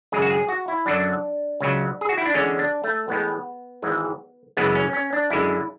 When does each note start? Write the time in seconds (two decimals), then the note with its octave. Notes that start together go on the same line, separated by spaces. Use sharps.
0.12 G#1 F#2 C#3 G#3 G#4
0.22 F#4
0.30 G#4
0.49 F#4
0.68 E4
0.86 F#2 D3 F#3 D4
1.60 C#2 C#3 F#3
2.01 G#4
2.09 F#4
2.18 E4
2.26 D4
2.34 E2 D3 G#3 C#4
2.59 D4
2.84 A3
3.08 A1 A2 G#3 B3
3.82 G#1 G#2 E3 G#3
4.57 F#2 C#3 E3 G#3 B3
4.75 C#4
4.93 C#4
5.13 D4
5.30 F#2 D3 G#3 E4